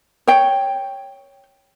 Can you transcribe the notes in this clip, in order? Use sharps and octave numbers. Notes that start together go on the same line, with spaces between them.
C#5 G5